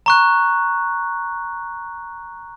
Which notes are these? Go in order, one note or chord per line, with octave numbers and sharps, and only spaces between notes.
A#5 C#6 F#6